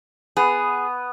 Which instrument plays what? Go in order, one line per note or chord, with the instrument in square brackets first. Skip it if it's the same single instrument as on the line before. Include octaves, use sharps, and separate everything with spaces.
[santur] B3 [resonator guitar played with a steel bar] G#4